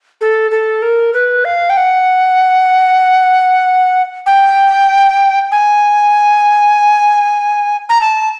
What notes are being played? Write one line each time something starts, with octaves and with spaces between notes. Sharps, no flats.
A4
A4
A#4
B4
F5
G5
F#5
G5
G#5
A#5
A5